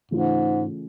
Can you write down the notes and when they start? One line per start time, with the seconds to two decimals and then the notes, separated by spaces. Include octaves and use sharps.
0.11 G#2 C#3 E3 A3 C#4 F4